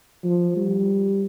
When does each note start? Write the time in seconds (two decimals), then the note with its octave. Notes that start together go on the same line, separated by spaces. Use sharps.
0.24 F3
0.57 G3